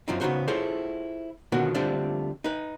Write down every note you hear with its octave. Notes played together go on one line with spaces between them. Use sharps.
F#2 F3 C4 D#4
C#3 B3 C4 D#4 F#4 C5
E4 F4 G#4 A4 C5 C#5
B2 D3 D#3 F3 B3 F#4
D3 F3 G3 A3 C4 D4
D#4 B4